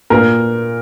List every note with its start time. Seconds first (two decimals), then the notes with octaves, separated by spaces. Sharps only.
0.10 A#2 A#4